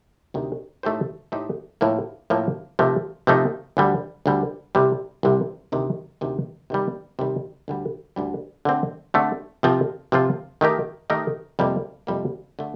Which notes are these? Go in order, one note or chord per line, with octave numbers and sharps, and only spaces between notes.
D2 C3 D#3
A2 A3 D#4 G4 C5
A2 A3 D#4 G4 C5
A2 F3 A#3
A2 F3 A#3
C3 F3 A3 D#4 A#4
C3 F3 A3 D#4 A#4
D2 D3 G3
D2 D3 G3
C2 C3 G3
C2 C3 G3
D2 C3 D#3
D2 C3 D#3
C3 D#3 G3
C3 D#3 G3
D2 D3 G3
D2 D3 G3
D3 A3 C4
D3 A3 C4
C3 F3 C4 F4
C3 F3 C4 F4
D#3 A3 D#4 G4 A#4
D#3 A3 D#4 G4 A#4
F2 C3 G3 A#3
F2 C3 G3 A#3
D3 A3